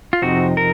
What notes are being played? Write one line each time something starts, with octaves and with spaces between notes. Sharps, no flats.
F4
F2 C3 F3 C4 D#4 F#4
A#4